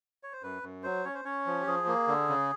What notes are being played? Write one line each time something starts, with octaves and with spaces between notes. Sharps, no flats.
C#5
C5
F#2 B4
F#2
F#3 C5
C#4 C#5
C5
C#4 C#5
F3
G4
F3 G#4
A#3
D3
C#3